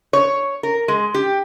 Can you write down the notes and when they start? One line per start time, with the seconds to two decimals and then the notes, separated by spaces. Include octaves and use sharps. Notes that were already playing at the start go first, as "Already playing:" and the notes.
0.13 C#5
0.63 A#4
0.88 G#3
1.14 G4